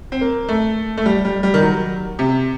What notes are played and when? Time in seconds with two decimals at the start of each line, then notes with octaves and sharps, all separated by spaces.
0.12 C4
0.21 A#3
0.49 A3
0.97 A3
1.06 G3
1.25 G3
1.43 G3
1.54 D#3
1.62 F#3
2.19 C3